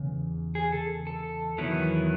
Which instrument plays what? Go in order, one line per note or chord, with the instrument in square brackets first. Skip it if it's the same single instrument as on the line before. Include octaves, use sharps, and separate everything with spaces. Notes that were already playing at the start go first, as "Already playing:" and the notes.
Already playing: [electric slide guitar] E2 C#3
G#4
A4
A4
E2 D#3 F#3 B3 E4